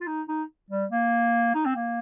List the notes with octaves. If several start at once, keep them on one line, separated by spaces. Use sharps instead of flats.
F4
D#4
D#4
G3
A#3
D#4
C4
A#3